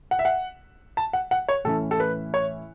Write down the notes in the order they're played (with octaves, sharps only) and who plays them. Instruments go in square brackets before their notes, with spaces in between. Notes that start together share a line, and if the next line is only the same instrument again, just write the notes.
[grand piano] F#5
E5
F#5
A5
F#5
F#5
C#5
A2 E3 C#4 E4 A4
A4
B4
C#5